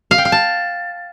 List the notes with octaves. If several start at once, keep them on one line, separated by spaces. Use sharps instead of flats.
F5
G5
F5
A5